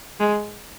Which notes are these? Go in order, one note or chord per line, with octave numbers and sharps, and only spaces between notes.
G#3